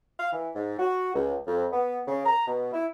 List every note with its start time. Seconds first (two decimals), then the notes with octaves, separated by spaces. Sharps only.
0.20 F5
0.33 E3
0.55 G#2
0.79 F#4
1.14 C#2
1.46 F2
1.72 B3
2.08 C#3
2.26 A#5
2.47 B2
2.73 E4